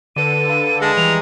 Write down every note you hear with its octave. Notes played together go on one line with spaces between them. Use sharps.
D3 A4 B4 D5 D#7
F5 B5
G#3 A5
E3 G3 A#5 F7